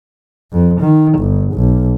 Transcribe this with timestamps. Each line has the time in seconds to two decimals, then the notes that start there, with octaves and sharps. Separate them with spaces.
0.52 F2
0.81 D#3
1.19 G1
1.54 B1